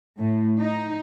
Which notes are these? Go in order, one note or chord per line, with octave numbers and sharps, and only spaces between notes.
A2
D#4